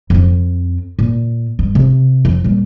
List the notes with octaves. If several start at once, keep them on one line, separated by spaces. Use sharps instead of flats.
F2 C4
A#2
G2
C3
F2
A#2 G3